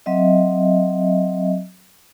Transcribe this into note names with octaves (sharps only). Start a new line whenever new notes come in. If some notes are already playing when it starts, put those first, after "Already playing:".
F#3 C4 D#5 E5